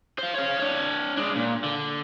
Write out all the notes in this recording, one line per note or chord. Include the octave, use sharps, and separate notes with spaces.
C5 F5
C#5 F5
D4 C#5
G#3 D4
A#2
D3